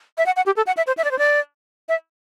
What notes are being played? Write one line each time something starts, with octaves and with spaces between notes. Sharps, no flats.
E5
F#5
F#5
G4
A4
F#5
E5
C5
E5
D5
C5
D5
E5